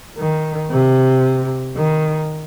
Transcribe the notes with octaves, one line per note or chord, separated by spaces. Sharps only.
D#3
C3
D#3